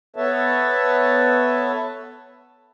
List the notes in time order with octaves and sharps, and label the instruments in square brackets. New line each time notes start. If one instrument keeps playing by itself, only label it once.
[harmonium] B3 A4 B4 C#5 E5 A5